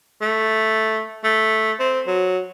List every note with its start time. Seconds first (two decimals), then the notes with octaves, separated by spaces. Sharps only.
0.22 A3
1.24 A3
1.80 C4
2.07 F#3